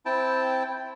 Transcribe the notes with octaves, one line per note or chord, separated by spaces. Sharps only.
C4 E4 G5 A5